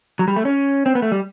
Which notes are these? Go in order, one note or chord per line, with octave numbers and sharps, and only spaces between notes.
F#3
G3
A3
C#4
C4
B3
A3
G3